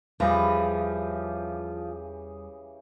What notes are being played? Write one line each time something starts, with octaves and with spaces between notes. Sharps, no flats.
E2 C#3 E3 F3 G3 G4 D#6